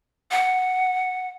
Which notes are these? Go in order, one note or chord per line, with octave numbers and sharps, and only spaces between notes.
F#5